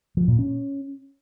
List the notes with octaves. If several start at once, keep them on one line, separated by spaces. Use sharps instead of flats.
F3
A#2
C#4